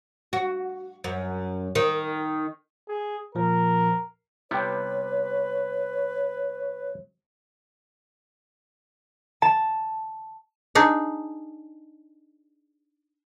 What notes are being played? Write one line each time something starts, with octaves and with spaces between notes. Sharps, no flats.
F#4
F#2
D#3
G#4
A#2 F3 A#4
C3 G3 B3 E4 B4 C#5 G5
A5
D4 D#4 G#4